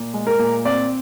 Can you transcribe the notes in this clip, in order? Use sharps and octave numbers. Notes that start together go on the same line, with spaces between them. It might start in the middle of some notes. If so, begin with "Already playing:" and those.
Already playing: A#2
G#3
A#4
A#2
C4 D5